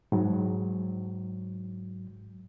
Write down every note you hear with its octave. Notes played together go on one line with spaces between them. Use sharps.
G#2 F#3